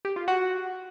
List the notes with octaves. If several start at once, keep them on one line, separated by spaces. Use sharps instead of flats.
G4
F4
F#4